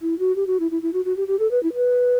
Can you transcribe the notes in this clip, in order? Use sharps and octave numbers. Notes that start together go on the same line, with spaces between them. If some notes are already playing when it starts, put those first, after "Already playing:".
E4
F#4
G4
F#4
E4
E4
E4
F#4
F#4
G4
G4
A4
B4
E4
B4